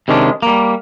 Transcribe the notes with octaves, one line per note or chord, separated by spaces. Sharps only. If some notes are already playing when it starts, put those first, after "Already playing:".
C3 D#3 G#3 C#4 D4
G3 A#3